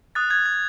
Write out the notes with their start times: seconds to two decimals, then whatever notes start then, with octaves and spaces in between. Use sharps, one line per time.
0.15 D#6 F#6 A6
0.30 G#6
0.46 G#6